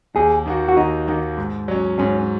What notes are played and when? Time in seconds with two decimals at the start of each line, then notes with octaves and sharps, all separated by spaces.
0.16 D#2 G#4
0.46 D#3 A#3 F#4
0.68 F#4
0.77 D#2 D#4
1.08 D#3 A#3 F#4
1.37 G#2
1.68 F#3 C#4
1.99 G#2 C#4